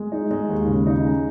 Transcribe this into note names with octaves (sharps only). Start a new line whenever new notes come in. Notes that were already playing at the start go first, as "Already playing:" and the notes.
Already playing: G#3
D#4
G#3
D#2
C#3
D#4
G#3